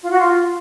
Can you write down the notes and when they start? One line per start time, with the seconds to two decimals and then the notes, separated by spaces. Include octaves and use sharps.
0.02 F4
0.10 F#4
0.19 F4